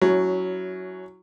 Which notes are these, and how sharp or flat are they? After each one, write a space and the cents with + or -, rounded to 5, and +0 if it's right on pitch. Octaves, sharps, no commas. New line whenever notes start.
F#3 +0 C#4 +20 E4 -10